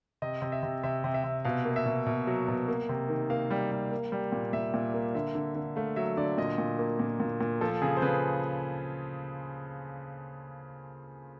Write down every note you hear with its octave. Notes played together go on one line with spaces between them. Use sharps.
C3 D#5
C3
E5
C3
C3 E5
C3
E5
C3
B2 F5
A#3
E5
B2
B2
F#3
B2
A#3
C3
D#3
A#3 F5
G3
G3
A#3
G3
A#2
A#2 E5
A#2
A#3
D3 E5
D3
D3
A3 F5
F#3 E5
D3 D5
A#2 D#5
A#2
A#3
A#2
A#2
A#2
F3 A4
C#3 G#4
C5
C#3 B4